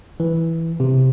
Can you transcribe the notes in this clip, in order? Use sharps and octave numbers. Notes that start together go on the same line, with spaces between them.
E3
C3